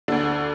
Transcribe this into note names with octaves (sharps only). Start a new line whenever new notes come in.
D2 D3 D4